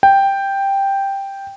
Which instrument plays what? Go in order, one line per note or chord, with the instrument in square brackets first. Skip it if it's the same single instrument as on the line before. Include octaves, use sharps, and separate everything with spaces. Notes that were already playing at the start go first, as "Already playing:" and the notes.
[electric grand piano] G5